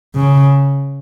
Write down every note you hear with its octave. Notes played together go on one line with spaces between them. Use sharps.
C#3